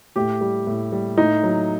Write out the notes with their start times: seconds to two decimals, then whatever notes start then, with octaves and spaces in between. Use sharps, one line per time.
0.16 A2 G4
0.41 G3
0.67 A2
0.92 G3
1.18 A2 D#4
1.43 F#3